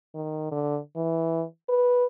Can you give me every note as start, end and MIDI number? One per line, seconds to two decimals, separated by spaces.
0.15 0.47 51
0.51 0.79 50
0.96 1.43 52
1.69 2.05 71